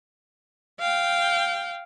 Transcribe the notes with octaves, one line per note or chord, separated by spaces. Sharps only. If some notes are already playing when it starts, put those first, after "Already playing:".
F5 G5